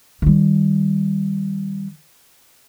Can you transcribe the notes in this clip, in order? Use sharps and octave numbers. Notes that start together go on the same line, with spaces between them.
D#3 G3